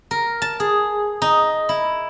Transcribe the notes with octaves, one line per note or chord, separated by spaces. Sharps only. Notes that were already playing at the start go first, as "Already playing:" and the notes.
A#4
A5
G#4
D#4
E4